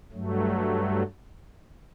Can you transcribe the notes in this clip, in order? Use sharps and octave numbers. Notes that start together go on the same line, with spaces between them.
G2 F#3 A3